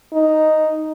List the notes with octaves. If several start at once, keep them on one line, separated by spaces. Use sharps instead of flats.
D#4